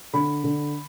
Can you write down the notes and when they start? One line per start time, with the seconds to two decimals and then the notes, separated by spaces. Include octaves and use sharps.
0.13 D3 B5
0.44 D3